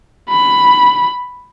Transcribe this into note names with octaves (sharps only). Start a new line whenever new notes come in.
B5